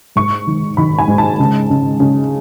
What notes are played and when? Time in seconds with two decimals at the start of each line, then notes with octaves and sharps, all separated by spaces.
0.16 G#2 C#6
0.47 D#3
0.77 D#3 B5
0.98 G#5
1.08 G#2
1.18 A5
1.39 C#3
1.70 C#3
2.00 C#3